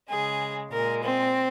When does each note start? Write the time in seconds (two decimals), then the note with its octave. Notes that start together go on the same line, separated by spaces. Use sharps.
0.10 C#3 G#3 G#4
0.72 A#2 G#3 A#4
1.03 C4